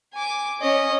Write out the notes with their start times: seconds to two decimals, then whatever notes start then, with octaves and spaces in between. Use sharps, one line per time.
0.13 G#5 D6
0.61 C#4 D#5